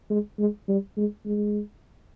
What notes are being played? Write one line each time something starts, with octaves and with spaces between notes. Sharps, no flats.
G#3
G#3
G3
G#3
G#3